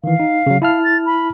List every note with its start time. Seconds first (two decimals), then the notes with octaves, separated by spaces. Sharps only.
0.04 D#3 E3 F5
0.20 D#4
0.46 C#3 F#3
0.62 E4 F5 A5 F6
0.83 A6
1.05 B5